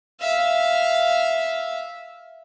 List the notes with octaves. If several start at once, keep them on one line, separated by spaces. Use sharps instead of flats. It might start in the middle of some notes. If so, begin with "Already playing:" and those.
E5 F5